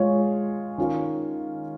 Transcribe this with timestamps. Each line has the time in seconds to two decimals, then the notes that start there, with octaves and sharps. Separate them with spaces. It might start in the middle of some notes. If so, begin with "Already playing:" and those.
Already playing: G#3 F4 G#4 C#5
0.78 D#3 C#4 F4 C#5